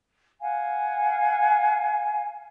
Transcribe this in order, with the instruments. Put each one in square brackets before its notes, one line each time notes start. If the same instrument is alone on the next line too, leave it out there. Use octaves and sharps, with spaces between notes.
[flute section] F5 F#5 G#5